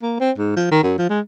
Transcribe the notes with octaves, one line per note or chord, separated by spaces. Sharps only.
A#3
C4
G#2
F3
D#3
F#2
F3
G#3